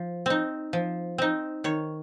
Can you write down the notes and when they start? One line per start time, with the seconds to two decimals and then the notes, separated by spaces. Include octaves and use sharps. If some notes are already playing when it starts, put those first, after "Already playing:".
Already playing: F3
0.26 C4 D#4
0.73 F3
1.18 C4 D#4
1.64 D#3 C#5